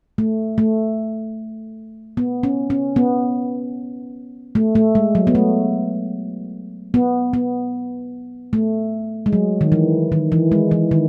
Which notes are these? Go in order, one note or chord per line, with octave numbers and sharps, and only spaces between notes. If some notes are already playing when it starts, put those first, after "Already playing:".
A3
A3
B3
C#4
C#4
B3
A3
A3
G#3
F#3
B3
A3
B3
B3
A3
G#3
F#3
D#3
E3
D#3
E3
G#3
E3
D#3